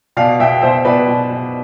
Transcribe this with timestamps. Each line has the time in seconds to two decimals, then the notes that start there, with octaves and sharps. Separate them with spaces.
0.17 B2 D5 F5
0.39 B2 E5 G5
0.62 B2 C5 E5
0.85 B2 B4 D5
1.08 B2
1.30 B2